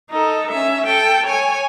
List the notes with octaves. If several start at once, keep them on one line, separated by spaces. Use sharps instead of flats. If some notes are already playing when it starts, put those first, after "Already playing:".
D#4 A4
C#4 E5
A4 G5
C#5 G#5